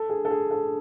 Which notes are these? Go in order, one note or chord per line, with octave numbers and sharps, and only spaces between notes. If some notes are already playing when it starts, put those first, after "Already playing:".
Already playing: A4
G#4
A4
G#4
A4